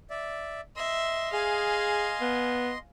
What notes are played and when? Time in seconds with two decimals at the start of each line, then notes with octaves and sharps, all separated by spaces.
0.10 D5 E5
0.76 D#5 E5 C6
1.33 G#4 F5 G#5
2.21 B3